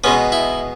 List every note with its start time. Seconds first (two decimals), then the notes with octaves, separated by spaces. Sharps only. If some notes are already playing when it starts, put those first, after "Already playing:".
0.04 B2 G#3 B3 C#4
0.32 E4